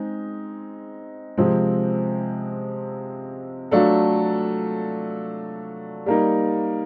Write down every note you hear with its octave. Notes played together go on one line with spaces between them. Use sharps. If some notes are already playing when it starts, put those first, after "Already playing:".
Already playing: G#3 C4 D#4
C3 F3 G#3 C4
F#3 A3 D4 F4 A4
G3 A#3 D#4